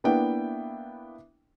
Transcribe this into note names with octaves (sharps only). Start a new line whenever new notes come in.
A#3 B3 D4 E4 G5